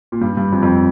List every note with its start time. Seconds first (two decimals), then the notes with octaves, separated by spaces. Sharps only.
0.12 A#2
0.21 G2
0.37 G2
0.52 F2
0.63 F2